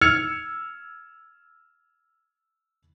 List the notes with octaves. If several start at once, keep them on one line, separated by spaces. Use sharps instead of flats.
E6 F6 G#6 C#7 F7